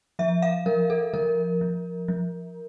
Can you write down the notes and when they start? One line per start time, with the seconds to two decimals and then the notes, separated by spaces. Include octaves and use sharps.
0.19 F3 E5
0.42 F5
0.66 F3 A#4
0.90 A4
1.13 F3 A#4
1.61 F3
2.08 F3